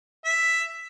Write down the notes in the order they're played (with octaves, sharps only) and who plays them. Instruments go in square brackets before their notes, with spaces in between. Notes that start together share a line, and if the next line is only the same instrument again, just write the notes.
[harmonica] E5